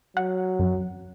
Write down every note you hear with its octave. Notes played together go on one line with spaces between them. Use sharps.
F#3 F#5
F#2